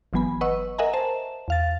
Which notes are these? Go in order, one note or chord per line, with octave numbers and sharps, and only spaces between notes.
G1 E3 F#3 B3 G#5 B5
B4 D#5 F#5 C#6 E6
A#4 D#5 E5 F#5 G#5 A#5
C5 A5 E7
E2 F5 A6